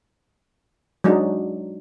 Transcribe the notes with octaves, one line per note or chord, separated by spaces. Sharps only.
F#3 G#3 D4 D#4